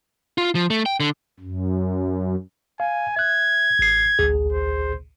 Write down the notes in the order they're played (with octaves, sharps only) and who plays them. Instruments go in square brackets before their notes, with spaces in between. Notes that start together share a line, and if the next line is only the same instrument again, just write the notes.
[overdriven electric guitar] F4
F3
A3
G5
D3
[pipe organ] F#2
[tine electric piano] F5 [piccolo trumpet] G#5
[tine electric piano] E5 F#6 [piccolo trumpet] G#6
[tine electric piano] A1 C7
A1 D2 G#4
[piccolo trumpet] C5